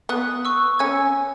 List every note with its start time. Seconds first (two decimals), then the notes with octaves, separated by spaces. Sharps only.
0.09 B3 D#6 F#6
0.45 C#6 E6
0.79 C#4 E6 G#6